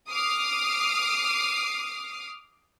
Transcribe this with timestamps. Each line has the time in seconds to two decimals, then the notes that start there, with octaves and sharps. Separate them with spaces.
0.10 D6 D#6 F6 C7